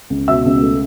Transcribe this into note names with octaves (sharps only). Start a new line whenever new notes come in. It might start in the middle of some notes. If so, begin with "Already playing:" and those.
C#2
B2 E5 E6
C#2
A3